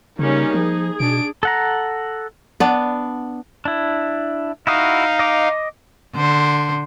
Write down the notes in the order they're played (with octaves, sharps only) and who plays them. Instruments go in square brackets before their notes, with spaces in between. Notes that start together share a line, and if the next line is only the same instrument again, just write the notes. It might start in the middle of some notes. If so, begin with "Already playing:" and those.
[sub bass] C#3 [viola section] G3 A#3 C#4 [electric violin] D#4
[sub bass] F3 [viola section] G#4
[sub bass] B2 [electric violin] D4 D7
[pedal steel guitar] A4 F#5 A#5
[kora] B3 D4
[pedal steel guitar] D4 E4
[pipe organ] D#4 F5 [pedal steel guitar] E4 F#4 D#6
[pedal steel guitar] D#5 D6
[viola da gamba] D3 C5